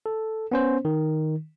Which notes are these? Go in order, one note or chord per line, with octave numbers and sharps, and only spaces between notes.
A4
B3 C#4 C5
D#3